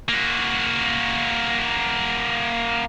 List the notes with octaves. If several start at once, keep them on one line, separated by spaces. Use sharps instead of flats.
A#3 F#4